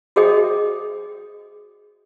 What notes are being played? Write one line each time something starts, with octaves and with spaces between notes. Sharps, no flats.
F#4 G#4 C5 D#5 G5 D#6